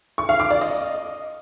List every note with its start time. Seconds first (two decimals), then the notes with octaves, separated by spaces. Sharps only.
0.18 C#6
0.29 F5
0.40 D6
0.51 D5
0.61 D#5